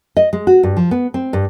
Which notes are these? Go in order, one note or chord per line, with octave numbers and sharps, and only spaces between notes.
D#5
G#3
F#4
G2
F3
B3
C4
G2